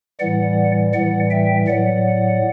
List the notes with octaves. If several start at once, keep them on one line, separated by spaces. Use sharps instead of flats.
A2 E3 G3 D5 F#5
A2 E3 G3 D5 F#5
E5 G5
A2 F#3 D5 F#5